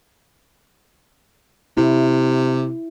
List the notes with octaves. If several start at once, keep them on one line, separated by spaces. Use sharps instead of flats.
C3 E4